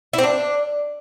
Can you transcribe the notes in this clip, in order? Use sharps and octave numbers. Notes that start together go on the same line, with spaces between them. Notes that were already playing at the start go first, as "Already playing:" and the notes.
E4
C4
D4